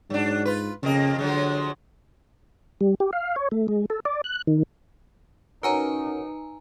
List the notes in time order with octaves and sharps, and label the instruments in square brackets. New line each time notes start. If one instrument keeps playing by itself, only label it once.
[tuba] G#2 [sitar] F#3 D4
[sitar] F4 B4
[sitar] F2 A#3 D#5 [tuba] C#3
[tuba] D3 [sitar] F3 F#3 G#3
[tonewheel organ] G3
G4
F5
C#5
A3
G#3
A4
D5
F#6
D#3
[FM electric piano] C#4 F#4 A#4 [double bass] D#4 [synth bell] B4 G#5 A#5